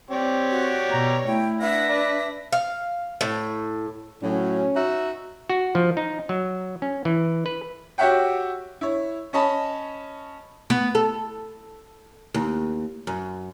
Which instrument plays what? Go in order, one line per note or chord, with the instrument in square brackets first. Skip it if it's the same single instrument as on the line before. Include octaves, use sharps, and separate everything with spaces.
[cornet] C4 [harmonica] G4 C#5 D5
[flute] F#4
[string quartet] B2 [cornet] A#5
[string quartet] A3 [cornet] E4 [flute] G5
[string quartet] D4 A#6 [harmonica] B4 F#5 [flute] E5
[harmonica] B4 [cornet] D5
[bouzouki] F5
A2
[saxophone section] A2 F#3 [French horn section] C#4
[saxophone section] D#4 F#4 E5
[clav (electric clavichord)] F#4
F3
D#4
F#3
C#4
E3
B4
[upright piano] F#4 G4 C#5 E5 F#5 G5
E4 C#5
C#4 C#5 D#5 A5 B5
[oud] B3
A4
D#2
F#2